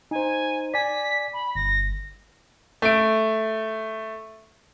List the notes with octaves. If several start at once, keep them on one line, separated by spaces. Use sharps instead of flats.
D#4 C5 G#5
D5 G#5 B6
B5
G1 A#6
A3 D7